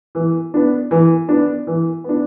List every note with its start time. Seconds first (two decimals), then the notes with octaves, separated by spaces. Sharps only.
0.15 E3
0.54 B3 D4
0.91 E3
1.29 B3 D4
1.67 E3
2.04 B3 D4